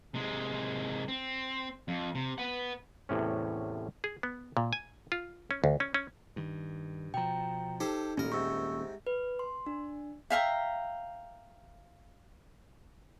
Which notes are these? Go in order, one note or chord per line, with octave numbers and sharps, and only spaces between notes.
C3 G#3
C4
F2
C3
B4 F#5
E2 A2 C3 C#4
G#4
B3
A#2
G#5
F4
C#4
D2
C#4
C#4
G2 D#3
B2 F3 G5 A#5
D#4 G4 A4 C5
D#1 A1 A#2 C#4 A#4
G#2 C3 C#6 E6
B4
C6
D4
E5 F5 G5 A#5